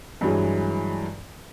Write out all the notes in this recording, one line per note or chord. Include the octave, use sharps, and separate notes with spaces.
G2 E3 F#3 G#3